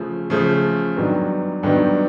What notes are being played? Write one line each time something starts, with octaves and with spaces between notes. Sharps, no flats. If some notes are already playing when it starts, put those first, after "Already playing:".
Already playing: C#3 F3 A3
C#3 F3 A3
G2 D#3 F#3 B3
G2 D#3 F#3 B3